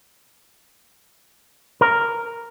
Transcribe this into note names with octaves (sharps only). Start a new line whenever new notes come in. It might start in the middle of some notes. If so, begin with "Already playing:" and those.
A#4